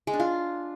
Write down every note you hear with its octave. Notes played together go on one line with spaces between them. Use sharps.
G#3
D4
F4